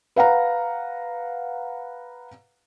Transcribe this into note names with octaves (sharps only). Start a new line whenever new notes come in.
B4 F5 F#5 A#5